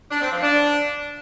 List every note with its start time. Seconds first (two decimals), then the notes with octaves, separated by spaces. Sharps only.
0.11 D4
0.21 C4
0.32 F3
0.43 D4